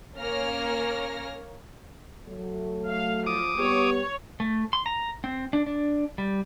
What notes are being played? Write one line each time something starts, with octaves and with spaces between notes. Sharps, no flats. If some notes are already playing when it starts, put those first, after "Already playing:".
A#3 C#4 A#4 C#5 F6 A#6
F#3 A3
F5
F3 D6 D#6
G3 B3 G4 C#5
A3
C6
A#5
C4
D4
D4
G3